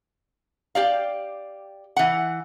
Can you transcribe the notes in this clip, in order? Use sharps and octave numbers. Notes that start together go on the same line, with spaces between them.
G4 D5 F5
E3 F#5